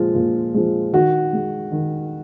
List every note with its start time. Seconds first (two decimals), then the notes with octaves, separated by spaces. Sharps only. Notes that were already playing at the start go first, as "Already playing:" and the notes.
Already playing: A#2 F3 G#3 F4
0.15 A#2
0.54 F3 G#3
0.93 D#3 F#4
1.33 G#3
1.72 D#3